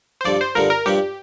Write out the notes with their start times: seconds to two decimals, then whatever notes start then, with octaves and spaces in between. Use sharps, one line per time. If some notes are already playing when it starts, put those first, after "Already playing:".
0.21 C5
0.25 G2 D3 F3 D5
0.41 C5
0.55 G2 D3 F3 A#4
0.70 A#4
0.86 G2 F3 D4 G4